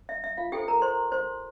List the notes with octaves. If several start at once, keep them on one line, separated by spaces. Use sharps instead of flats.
E5
E5
F4 F5
E4 G4 A4 C5 G5
A#4 A#5
C5 C6
C5 C6